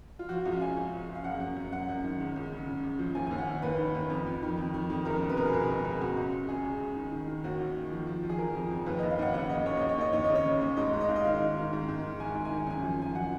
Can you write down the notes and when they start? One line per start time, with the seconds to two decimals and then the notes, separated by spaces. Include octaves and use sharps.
0.19 F4
0.29 F3 F#4
0.45 C#2 F5
0.61 C#2 G#5
0.77 C#2
0.93 C#2
1.09 C#2
1.15 F5
1.24 F#2 F#5
1.40 F#2
1.57 F#2
1.72 F#2 F#5
1.89 F#2
2.04 D#3
2.20 C#2
2.36 C#2
2.51 C#3
2.67 C#3
2.83 C#2
2.99 F3
3.15 D#2 G#5
3.27 D#2 G#5
3.38 F#5
3.46 D#3
3.62 D#2 B4
3.78 D#3
3.95 D#2
4.10 F2
4.26 F2
4.43 D#3
4.57 F2
4.74 D#3
4.90 F2
5.05 C#2 A#4
5.22 B2
5.30 B4
5.37 B2 A#4
5.46 G#4
5.53 C#2 A#4
5.69 C#2
5.85 C#2
6.01 C#2 F#4
6.17 C#2
6.33 C#2
6.48 C#3 G#4
6.64 C#2
6.80 C#2
6.96 D#3
7.12 D#3
7.28 D#3
7.44 D#2 F#4
7.60 D#3
7.75 D#3
7.92 F3
8.07 F3
8.23 F3
8.30 G#4
8.38 F3 A#4
8.55 F2
8.71 F2
8.86 D#2 B4
8.99 D#2 D#5
9.10 F5
9.19 D#2 F#5
9.34 C#3 F#5
9.49 C#3 D#5
9.66 D#2 C#5
9.77 D#2 D#5
9.89 C#5
9.98 D#2 D#5
10.12 D#2 C#5
10.24 D#5
10.30 C#3
10.35 C#5
10.45 C#3
10.61 D#2
10.77 G#2 D#5
10.93 G#2
11.01 D#5
11.09 G#2 F5
11.16 D#5
11.24 D#3 F5
11.40 D#3
11.57 D#3
11.73 G#2
11.88 G#2
12.03 D#3
12.20 D#3 G#5
12.35 G#2
12.45 G#5
12.51 D#3
12.67 F#2 G#5
12.83 F3
12.99 F#2 G#5
13.15 F3 F#5